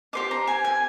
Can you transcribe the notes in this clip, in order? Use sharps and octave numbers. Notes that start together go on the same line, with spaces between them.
G4 C5 D#5 D6
A#5
G#5
G#5